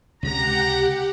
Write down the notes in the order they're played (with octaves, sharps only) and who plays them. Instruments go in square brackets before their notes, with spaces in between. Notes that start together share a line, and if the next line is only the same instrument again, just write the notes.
[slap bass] C#2 C3 G#3 [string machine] G4 F#5 [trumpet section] A#5